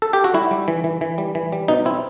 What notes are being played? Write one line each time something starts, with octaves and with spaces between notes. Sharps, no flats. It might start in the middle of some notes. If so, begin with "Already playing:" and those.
A4
G4
F#4
G3 E4
G3
E3
E3
E3
G3
E3
G3
B2 D#4
C4 E4